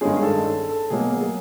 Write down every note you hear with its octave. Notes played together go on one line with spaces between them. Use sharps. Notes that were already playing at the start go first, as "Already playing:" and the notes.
G2 D#3 G#3 C#4 G#4
G#4
A4
A4
A4
B2 F#3 A#3 G#4
G#4